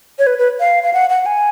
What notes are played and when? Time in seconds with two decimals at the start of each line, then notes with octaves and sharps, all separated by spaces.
0.19 C#5
0.27 B4
0.38 B4
0.60 F5
0.84 F5
0.93 F#5
1.10 F#5
1.26 G#5